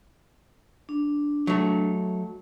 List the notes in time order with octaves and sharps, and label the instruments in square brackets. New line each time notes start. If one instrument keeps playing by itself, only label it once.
[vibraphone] D4
[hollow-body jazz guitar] F#3 A3